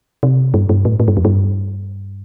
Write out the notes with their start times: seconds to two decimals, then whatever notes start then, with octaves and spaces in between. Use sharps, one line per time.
0.23 C3
0.54 G2
0.69 G2
0.85 A2
1.00 A2
1.08 G2
1.17 F2
1.25 G2